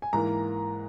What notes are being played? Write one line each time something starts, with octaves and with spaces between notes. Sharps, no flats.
G#5
G#2 E3 A#3 A#5